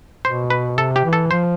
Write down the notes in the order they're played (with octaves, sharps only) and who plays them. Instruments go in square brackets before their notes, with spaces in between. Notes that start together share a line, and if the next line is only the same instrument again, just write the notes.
[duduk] B2 [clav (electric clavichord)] C5
[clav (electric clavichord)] B4
[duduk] C3 [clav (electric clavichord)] A4
[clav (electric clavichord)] G4
[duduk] E3
[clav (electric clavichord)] A4
[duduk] F3 [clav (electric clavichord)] C5